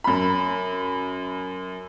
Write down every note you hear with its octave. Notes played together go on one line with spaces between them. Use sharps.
F#2 B5